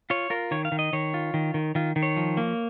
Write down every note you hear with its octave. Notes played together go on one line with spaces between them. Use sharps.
F4 C#5
F4 A#4
D#3 C#5
F5
D#3
D#5
D#3 C#5
F4
D#3
D#3
D#3 F4
D#3
C#5
F3
A#3